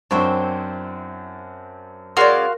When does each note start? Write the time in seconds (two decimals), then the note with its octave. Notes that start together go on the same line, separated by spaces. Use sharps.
0.11 F#2 C4 D4 E4 C5 G5 C#6
2.17 G#3 C#4 F#4 A#4 D5 F5 C6